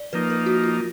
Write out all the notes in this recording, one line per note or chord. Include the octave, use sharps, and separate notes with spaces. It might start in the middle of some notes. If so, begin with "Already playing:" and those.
Already playing: D5
F3 A#3 D#4 B4
A#4
F#4
F4